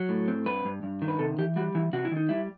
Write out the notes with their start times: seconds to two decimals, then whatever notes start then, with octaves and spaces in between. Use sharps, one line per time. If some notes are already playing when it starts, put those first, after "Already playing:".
Already playing: F#3
0.09 A2
0.28 C4
0.46 G2 B4
0.65 G2
0.83 G2
1.02 D#3
1.08 B4
1.19 C3 A4
1.39 E3 G4
1.56 G3 F#4
1.75 E3 E4
1.93 C3 F#4
2.05 E4
2.12 D#3 D#4
2.29 G3 E4